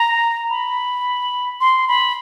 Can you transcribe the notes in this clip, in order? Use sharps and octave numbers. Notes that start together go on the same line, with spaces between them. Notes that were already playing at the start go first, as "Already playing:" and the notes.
Already playing: A#5
B5
C6
B5